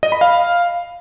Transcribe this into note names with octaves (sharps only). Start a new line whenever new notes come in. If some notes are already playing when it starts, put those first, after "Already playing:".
D#5
B5
F5